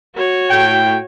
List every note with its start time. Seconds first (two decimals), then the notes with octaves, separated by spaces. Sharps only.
0.16 F#4 C#5
0.50 A2 G5